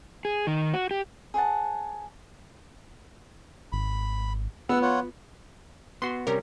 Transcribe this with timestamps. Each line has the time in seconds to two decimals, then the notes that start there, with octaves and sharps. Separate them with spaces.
0.25 G#4
0.47 D#3
0.73 F#4
0.91 G4
1.34 G#4 C5 F#5 A5
3.72 G#1 B5
4.69 F3 B3 F#5 E6
4.82 F4 C#5 F#5
6.02 B3 F#4 C6
6.27 C3 G3 C#4 A#4